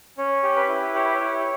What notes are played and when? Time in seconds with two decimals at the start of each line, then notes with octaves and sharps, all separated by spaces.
0.17 C#4 C#5
0.43 G4
0.56 B4
0.68 E4
0.94 G4 C#5
1.05 B4
1.15 C#5
1.20 E4